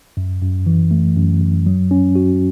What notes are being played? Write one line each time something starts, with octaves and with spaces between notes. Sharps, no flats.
F#2
F#2
E3
A3
F#2
F#2
F#3
C#4
F#4